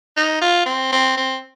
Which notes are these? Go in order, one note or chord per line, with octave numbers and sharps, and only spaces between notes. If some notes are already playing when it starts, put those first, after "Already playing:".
D#4
F4
C4
C4
C4